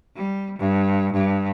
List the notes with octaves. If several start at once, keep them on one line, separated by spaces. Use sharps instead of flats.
G3
G2
G2